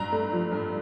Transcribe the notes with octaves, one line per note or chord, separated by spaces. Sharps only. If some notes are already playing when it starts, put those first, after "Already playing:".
Already playing: G2 A#5
A3
F3
G2